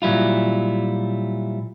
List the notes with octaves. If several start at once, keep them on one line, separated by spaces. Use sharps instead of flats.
A#2 F#3 G3 E4 F4